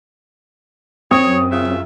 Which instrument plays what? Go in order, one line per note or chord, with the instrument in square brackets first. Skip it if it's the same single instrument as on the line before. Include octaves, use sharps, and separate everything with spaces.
[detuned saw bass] F#2 [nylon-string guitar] C4 [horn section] C#5 [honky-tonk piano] D#6
[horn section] C#3 F4 E5